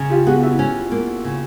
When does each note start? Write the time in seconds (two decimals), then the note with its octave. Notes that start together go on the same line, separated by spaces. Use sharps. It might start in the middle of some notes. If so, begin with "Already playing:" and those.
Already playing: C#3
0.10 F4 G4
0.26 B3 F#4 G#4
0.43 E4 F#4
0.59 C#4
0.92 A#3
1.24 C#3